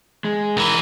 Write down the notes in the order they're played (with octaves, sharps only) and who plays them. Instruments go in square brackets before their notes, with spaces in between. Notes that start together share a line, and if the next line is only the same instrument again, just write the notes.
[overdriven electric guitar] G#3
[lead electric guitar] C#2 E3 [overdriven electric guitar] A#4